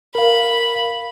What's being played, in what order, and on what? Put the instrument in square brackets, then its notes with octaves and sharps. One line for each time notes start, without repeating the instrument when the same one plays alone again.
[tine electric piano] A#4 F5 [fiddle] B5